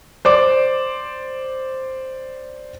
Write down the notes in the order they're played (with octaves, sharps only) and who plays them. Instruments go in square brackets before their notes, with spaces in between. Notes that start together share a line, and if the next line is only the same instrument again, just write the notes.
[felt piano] C5 D5 D6